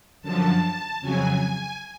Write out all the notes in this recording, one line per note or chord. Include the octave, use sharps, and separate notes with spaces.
F#2 D3 F3 A5
F2 C#3 F#3 G#5